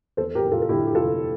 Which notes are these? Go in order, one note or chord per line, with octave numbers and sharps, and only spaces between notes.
E2 A4 C5
G4 A#4
F1
F4 A4
A4
D3 E4 G4
G4
F1 F4 A4